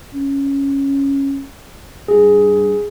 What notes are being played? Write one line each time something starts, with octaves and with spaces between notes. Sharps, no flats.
C#4
G2 G#4